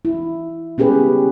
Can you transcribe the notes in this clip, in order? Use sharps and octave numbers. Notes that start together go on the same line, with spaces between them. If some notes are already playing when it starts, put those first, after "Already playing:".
E4
B3 C#4 G4 G#4 B4